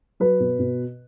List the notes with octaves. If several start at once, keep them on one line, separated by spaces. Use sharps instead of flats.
F#3 B4
B2
B2